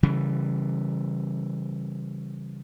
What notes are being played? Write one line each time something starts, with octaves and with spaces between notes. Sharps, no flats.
C#3 E3 G3